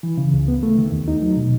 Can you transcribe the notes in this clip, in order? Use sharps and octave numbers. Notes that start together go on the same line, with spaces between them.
E3
C#3
C#2
B3
A3
D#3
D#2
D#4
F#3
B2